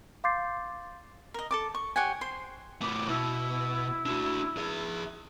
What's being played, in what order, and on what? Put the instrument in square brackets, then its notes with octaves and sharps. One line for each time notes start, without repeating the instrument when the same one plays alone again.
[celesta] F5 C6 D6 G6 A6 C7
[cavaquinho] A#4 D#5
A4 A5 D6
C#6
G4 C#5 F#5 G#5
C5 C6
[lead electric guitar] A2 B3 [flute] D6
[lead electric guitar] B2 [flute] E4
[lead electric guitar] D4 F#4
G#4 E5